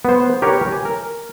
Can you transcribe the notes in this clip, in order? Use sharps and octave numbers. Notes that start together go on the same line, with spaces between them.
B3 C5
G4 A#4 B4 C#5
G#5
A#4